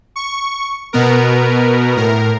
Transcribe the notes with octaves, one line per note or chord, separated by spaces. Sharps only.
C#6
B2 B3 A#4
A2 A#4